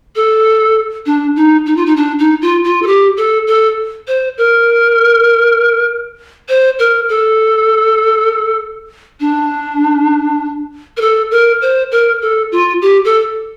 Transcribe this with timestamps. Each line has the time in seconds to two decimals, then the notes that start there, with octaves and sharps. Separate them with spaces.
0.16 A4
1.06 D4
1.36 D#4
1.66 D#4
1.77 F4
1.86 D#4
1.96 D4
2.19 D#4
2.42 F4
2.64 F4
2.82 A4
2.87 G4
3.17 A4
3.47 A4
4.08 C5
4.38 A#4
6.49 C5
6.79 A#4
7.09 A4
9.20 D4
10.97 A#4
11.01 A4
11.31 A#4
11.62 C5
11.91 A#4
12.22 A4
12.52 F4
12.82 G4
13.05 A4